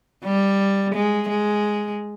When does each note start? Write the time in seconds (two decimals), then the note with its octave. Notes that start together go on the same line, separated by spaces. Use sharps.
0.24 G3
0.94 G#3
1.29 G#3